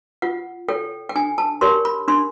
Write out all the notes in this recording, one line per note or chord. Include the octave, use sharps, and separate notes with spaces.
F4 F#5
A4 C#5 G5
G5
D4 G#5
A5
G4 A#4 C#5 C6
B5
D4 C6